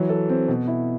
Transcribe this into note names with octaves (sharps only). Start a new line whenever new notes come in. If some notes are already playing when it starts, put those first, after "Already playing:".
Already playing: E3 F#3
A4
C4
B2
E4